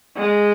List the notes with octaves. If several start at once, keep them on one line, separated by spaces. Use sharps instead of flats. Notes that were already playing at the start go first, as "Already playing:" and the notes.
G#3